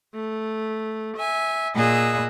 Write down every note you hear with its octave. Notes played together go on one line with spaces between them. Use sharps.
A3
E5 G#5
A#2 G#4 D#5 E6 F#6